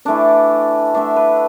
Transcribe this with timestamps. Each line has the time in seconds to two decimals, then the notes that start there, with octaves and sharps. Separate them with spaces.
0.05 E3 A3 D4 D5
0.94 D3 A3 D4 E5
1.16 B4